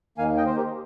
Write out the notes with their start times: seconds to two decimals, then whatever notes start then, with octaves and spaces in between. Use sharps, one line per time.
0.18 D#2 D#3 A#3 F5 G#5
0.37 D#5 G5
0.46 C5
0.56 G4 A#4